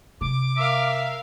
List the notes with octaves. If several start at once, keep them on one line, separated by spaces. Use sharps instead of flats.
C3 D6
A#4 E5 F5